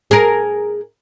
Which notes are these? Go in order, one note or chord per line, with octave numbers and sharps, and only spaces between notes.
G#4 A#4